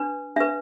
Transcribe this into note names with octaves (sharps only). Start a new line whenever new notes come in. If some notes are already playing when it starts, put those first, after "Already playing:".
Already playing: D4 B4
D4 B4 E5